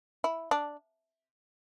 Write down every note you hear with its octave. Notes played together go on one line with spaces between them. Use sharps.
E4
D4